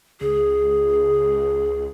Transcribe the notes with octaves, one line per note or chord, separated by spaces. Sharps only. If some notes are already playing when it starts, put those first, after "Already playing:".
C#2 G#4